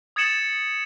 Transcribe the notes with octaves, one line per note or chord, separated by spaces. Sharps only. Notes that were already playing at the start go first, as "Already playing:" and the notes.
D#6 G#6 A6 C#7 E7 F#7